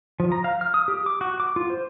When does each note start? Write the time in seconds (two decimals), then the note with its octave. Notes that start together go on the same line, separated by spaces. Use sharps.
0.20 F3
0.32 A#5
0.44 F5
0.61 F6
0.74 D#6
0.88 G4
1.06 D6
1.21 F#4
1.40 D6
1.56 F4
1.70 C5